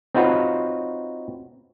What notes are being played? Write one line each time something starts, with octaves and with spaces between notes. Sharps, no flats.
C4 D#4 F4 F#4 B4 C#5